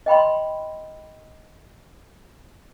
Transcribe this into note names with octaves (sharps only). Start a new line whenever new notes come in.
D#5 G5 B5 C6